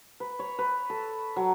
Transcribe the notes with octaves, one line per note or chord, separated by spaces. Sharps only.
B4
C#5
B4
A4
F#3